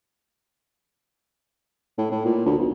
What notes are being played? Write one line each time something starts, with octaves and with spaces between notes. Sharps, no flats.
A2
A2
A#2
D2
B1